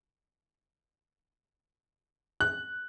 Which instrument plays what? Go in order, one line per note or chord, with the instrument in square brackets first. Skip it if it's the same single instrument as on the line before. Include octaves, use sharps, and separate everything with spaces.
[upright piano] F#6